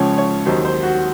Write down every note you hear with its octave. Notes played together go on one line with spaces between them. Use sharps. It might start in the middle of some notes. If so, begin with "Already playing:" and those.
Already playing: C#2 C#3 F3 C#5
C#5
D#2 D#3 F#3 C5
C5
F#4